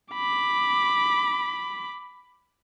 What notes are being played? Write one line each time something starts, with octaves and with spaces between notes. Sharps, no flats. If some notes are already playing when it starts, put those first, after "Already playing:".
B5 D6